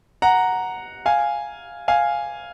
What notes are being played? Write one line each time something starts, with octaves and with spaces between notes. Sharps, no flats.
F#5 A#5
F5 G#5
F5 G#5